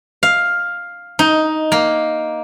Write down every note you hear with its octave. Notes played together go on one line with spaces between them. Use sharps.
F5
D#4
A#3